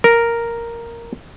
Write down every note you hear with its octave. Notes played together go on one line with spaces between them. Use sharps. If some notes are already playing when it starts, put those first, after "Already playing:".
A#4